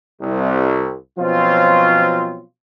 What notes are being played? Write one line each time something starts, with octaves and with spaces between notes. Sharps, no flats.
C2
B2 F3 F#3 C4 C#4 F4